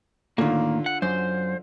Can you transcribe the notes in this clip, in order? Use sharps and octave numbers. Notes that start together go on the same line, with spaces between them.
A2 D3 D#3 A#3 F4
F#5
F#2 C5